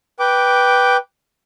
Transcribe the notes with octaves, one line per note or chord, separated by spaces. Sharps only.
B4 G5 D6